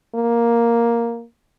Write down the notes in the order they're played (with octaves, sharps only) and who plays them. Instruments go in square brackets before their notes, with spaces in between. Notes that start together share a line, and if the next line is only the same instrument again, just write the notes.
[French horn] A#3